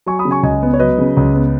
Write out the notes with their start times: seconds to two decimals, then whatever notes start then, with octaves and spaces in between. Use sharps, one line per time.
0.06 F#3 G#5 C#6
0.19 B5 D#6
0.25 C#3
0.31 G#5 C#6
0.43 C#2 D#5 G#5
0.62 B3
0.74 C#5
0.79 F#3 B4 D#5
0.98 C#3
1.17 C#2
1.34 B3